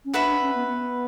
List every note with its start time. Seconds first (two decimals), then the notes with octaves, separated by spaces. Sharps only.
0.05 C#4
0.14 D4 F#4 B4 E5 B5
0.27 D4
0.42 C#4
0.55 B3
0.68 B3